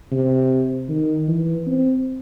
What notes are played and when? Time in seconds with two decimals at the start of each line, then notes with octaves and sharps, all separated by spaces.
0.12 C3
0.89 D#3
1.28 E3
1.66 C4